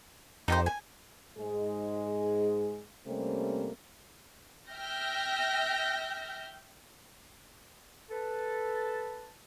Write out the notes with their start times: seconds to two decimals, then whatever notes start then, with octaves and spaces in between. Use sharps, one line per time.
0.48 F2 D#4 G4 C5
0.66 G#5
1.38 G#2 G#3 G#4
3.07 C3 G3 A3 A#3 C4 C#4
4.70 E5 G5 F6 G6 A#6
8.10 A4 B4 A5